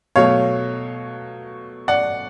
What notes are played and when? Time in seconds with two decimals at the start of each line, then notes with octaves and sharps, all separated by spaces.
0.16 B2 F#3 A3 C#5 F5
1.88 D5 F#5